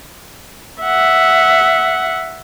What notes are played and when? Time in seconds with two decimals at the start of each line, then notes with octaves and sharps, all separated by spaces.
0.82 E5 F#5